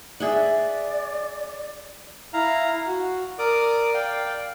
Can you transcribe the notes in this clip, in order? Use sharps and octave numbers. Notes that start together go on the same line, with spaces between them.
G#4 D5 E5 F#5
E4 F5 A#5
F#4
A#4 D5 D6 D#6
D5 F5 G5